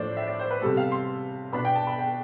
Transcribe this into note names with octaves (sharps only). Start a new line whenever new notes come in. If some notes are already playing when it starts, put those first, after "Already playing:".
Already playing: A2 F3 A3 D4 C5 D5
E5
D5
C5
B4
C3 G3 B3 A4
F5
C6
B2 B3 D4 B5
G5
A5
B5
G5